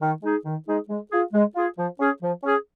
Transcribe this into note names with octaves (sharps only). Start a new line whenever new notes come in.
D#3
G#3 D#4 G#4
D#3
G#3 D#4 G#4
G#3
F4 G#4
G#3
F4 G#4
F3
C#4 G#4
F3
C#4 G#4